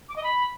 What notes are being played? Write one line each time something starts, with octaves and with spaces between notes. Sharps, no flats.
D6
D#5
B5